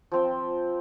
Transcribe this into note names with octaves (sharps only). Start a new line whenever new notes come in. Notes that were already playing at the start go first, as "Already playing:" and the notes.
F3 C4 G5